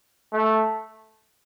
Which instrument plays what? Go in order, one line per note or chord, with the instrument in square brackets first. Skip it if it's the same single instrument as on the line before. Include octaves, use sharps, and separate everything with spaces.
[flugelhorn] A3